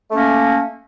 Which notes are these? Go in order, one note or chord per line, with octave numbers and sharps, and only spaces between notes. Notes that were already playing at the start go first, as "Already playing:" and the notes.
A3 A#3 C#4